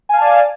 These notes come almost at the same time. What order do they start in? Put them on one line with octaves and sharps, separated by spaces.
G#5 F5 A5 D5